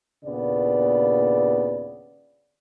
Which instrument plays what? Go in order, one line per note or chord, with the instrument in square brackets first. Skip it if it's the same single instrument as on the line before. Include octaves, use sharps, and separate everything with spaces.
[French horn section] D#2 A#2 C#3 B3 D4 D5